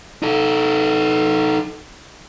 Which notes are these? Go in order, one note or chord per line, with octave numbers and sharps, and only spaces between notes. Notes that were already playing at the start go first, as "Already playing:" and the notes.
D#4 A4